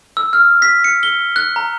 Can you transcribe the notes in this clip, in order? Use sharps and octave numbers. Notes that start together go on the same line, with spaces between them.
E6
F6
B6
C#7
G7
F#6
A#5